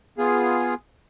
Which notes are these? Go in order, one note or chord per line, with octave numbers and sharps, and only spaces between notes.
B3 F4 G#4